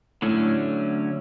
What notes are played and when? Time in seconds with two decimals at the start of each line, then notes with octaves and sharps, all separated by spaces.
0.22 A2 D3 F#3 A3 C#4